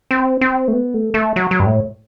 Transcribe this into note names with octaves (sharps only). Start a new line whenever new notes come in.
C4
C4
A3
B3
A3
A3
F#3
F#3
G2
A2